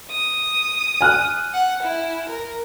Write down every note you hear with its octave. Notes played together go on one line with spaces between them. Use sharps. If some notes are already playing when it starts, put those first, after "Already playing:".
D#6
G#5 F6 F#6
F#5
E4
A#4